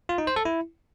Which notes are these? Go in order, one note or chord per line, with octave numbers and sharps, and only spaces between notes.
F4
D#4
C5
A4
E4